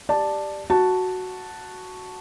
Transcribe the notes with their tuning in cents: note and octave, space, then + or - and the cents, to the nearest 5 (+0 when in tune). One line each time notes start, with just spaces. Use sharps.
G4 +0 D5 +10 A5 +0
F#4 +0 A5 +0